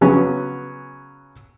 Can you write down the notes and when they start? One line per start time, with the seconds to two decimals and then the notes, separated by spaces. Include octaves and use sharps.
0.01 C#3 F#3 B3 C#4